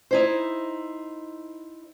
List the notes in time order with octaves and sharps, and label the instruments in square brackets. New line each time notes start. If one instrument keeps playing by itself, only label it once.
[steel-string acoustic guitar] D#4 E4 C5